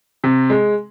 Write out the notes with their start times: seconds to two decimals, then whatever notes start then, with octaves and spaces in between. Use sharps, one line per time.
0.24 C3
0.50 G#3